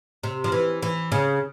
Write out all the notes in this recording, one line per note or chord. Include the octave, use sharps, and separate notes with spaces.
C3
F3
E3
E3
C#3